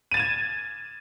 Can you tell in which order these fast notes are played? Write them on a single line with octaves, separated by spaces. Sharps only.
D#7 A6 E7 G#6